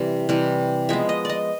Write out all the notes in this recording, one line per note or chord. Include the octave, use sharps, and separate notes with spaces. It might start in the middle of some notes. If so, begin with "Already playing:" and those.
Already playing: C3 E3 G3
C3 E3 G3
F3 G#3 B3 E5
D#5
D5 D#5